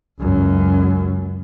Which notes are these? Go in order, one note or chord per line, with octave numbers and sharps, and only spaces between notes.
C#2 F#2